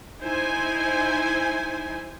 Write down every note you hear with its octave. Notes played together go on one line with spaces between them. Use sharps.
D#4 E4 C5 G#5